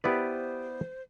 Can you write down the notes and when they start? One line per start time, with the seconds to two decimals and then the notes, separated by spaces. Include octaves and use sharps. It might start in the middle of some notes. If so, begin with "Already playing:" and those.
0.04 B3 E4 G4 B4 C5 D5